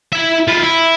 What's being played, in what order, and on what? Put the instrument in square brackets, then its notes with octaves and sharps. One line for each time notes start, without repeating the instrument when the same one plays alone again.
[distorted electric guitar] E4 E5
E4 F4
E4